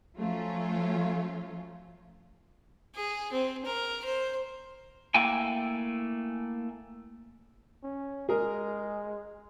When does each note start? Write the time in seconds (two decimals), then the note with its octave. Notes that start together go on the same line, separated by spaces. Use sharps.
0.18 F3 F#3 A3 C#4 F4
2.95 G#4
3.32 C4
3.65 A#4
4.05 C5
5.14 A3 A#3 E4 G5 G#5
7.83 C#4
8.29 G#3 G#4 A#4